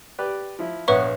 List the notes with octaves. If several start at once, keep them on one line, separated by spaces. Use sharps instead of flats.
G4 B4 D5
F3 E4
A#1 B3 B4 C#5 E5 C#6